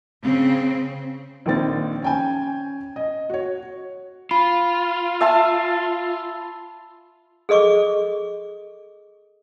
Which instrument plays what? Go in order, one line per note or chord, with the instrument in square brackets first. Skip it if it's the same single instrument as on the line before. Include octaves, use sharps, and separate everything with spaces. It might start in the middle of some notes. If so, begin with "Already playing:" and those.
[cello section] C#3 C4
[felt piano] A#1 D#3 C4 A6
C#4 G5 G#5
D#5
F#4 C#5
[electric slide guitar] F4 [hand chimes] B5
[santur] E5 A5 C6
[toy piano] G#4 A4 D#5 C#6 D6